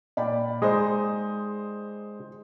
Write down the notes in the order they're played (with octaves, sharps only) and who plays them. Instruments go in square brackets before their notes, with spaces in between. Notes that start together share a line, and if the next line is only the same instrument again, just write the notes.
[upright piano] A#2 [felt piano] D5 G5 B5
[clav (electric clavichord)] G#3 D#4 [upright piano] C5 D#6